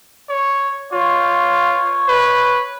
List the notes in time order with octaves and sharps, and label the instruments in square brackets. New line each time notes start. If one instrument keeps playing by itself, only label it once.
[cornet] C#5
[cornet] F4 [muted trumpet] C#5
[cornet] B4